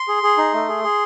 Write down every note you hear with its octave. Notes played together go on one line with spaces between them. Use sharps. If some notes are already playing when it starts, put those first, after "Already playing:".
Already playing: C6
G#4
G#4
D#4
A3
G#4
G#4